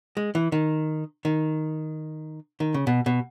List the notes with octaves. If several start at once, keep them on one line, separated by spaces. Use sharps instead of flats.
G#3
E3
D#3
D#3
D#3
C#3
B2
B2